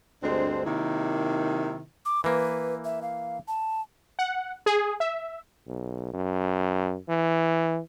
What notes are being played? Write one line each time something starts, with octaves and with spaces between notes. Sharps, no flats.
D2 G2 G#3 C4 D4 C5
C3 D#3 F#3 A#3 D#4 E4
D6
E3 A#3 B4
E5
F5
A5
F#5
G#4
E5
B1
F#2
E3